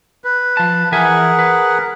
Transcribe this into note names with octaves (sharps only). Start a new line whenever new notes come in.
B4
F3 A5
E3 G#4 A#4 E5 F#5 G#5
B4